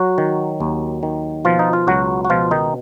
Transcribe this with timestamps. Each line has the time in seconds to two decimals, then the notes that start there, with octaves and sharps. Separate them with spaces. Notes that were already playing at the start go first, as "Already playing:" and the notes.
Already playing: F#3 F#4
0.18 D#3
0.60 D#2
1.03 D#3
1.45 B2 F3 F4
1.59 D#4
1.73 F4
1.87 C#2 F#3 F#4
2.25 F#4
2.30 B2 F3 F4
2.51 D#3 D#4